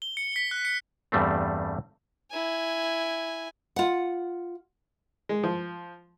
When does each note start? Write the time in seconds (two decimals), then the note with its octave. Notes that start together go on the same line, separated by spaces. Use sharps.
0.02 G7
0.17 C#7
0.36 B6
0.51 F#6
0.65 C#7
1.12 E2 G2 G3 A3 C4
2.31 E4 G#5
3.76 F4 F#5
5.29 G#3
5.44 F3